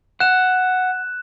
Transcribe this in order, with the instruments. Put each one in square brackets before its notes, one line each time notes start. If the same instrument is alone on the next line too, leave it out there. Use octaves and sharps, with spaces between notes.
[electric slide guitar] F#5 [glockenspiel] F#6 E7